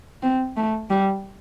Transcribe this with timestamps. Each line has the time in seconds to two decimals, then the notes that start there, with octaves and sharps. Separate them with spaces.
0.23 C4
0.57 A3
0.90 G3